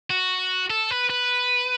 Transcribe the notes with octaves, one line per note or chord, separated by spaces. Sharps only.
F#4
A4
B4
B4